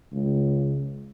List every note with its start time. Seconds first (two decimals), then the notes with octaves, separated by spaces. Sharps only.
0.12 C#2